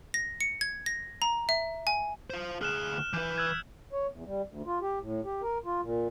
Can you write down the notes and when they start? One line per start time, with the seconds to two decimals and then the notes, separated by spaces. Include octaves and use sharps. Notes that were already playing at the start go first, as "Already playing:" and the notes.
0.14 A#6
0.41 C#7
0.61 G#6
0.86 A#6
1.22 A#5
1.49 E5
1.87 G#5
2.30 F4 C5
2.61 D2 G#4 F6 F#6 E7
3.13 E3 B4 G6
3.38 E6 F#6 G#6
3.93 C#5
4.11 E2
4.26 G3
4.48 D2
4.66 F4
4.82 G4
5.01 A2
5.25 G4
5.42 A#4
5.65 F4
5.82 A#2